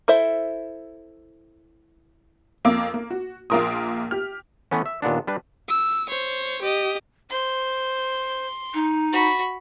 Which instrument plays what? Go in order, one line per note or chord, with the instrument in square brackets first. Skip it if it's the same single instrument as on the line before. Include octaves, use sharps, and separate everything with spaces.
[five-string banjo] E4 A4 C5 E5
[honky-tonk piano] F2 A#3 F5 D6 E6
A#3
F#4
A#1 A#3 F4 A#4 C6 D#6
G4 F6
[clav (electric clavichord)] E3 A3 B3 C#4
E5
D#2 A#2 B3 D4
G3 D4 B4
[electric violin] E6
C5 C#5
G4 D#5
[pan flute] C5 [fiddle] C6
[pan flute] D#4
[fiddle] F#4 B5